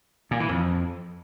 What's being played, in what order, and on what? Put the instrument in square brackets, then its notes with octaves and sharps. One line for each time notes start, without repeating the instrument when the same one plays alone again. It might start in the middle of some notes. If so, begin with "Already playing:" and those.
[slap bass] A#2
E3
F2